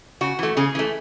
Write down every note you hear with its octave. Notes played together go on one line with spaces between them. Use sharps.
C#3 F#4
E3 A3
C#3 G#4
E3 A3